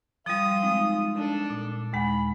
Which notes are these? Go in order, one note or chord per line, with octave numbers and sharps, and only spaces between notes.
F3 G3 F4 D#6
G#3 C4 D#4
D4 A4
A#2
D#2 G#3 F#5 B5